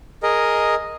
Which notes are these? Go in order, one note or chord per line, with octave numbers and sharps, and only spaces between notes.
G#4 A#4 D#5